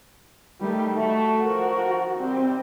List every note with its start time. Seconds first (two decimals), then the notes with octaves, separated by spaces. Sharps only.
0.61 D#3 G3 A3
0.96 A3 F#4
1.45 D#3 F3 A#4
2.19 C3 D#3 G3 C4